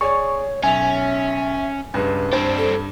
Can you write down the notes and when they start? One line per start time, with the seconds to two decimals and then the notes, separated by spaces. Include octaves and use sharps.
0.01 G#4 C#5 D5 C#6
0.64 B1 C#4 E5 G#5 F7
1.94 C#2 G2 B4
2.33 G2 C4 D4 C5
2.57 A4